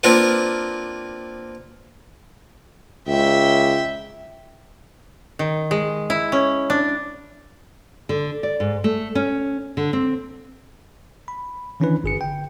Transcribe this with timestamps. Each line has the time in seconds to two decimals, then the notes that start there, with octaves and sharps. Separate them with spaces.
0.03 A#3 C4 D4 F4 A#4 B4
3.07 C#2 E5 G5
5.39 D#3
5.71 G#3
6.10 E4
6.32 C#4
6.70 D4
8.09 D3
8.43 D5
8.60 G#2
8.84 A3
9.15 C#4
9.77 D3
9.93 C4
11.28 B5
11.80 D#3 E3 C#4 D4 E4 B4
12.04 G1 G#4 C#7
12.21 D3 G5